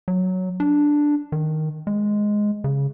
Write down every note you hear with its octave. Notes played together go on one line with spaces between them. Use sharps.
F#3
D4
D#3
G#3
C#3